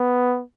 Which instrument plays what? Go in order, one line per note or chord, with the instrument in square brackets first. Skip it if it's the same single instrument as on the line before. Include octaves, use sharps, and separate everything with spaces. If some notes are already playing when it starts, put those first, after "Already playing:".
Already playing: [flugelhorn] B3